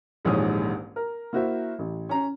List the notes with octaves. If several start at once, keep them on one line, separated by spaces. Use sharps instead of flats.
D#1 A#1 G#2 E3 C#5 D#6
A#4
A#3 E4 F#4 C5 E5
A1
C#4 A#5